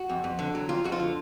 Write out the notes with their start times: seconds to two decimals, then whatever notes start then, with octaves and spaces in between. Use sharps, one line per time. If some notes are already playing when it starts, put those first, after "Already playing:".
Already playing: F#4
0.09 F2
0.24 F2
0.39 D3
0.55 F#3
0.69 F2 F4
0.84 F2 F#4
0.92 F4
1.00 D3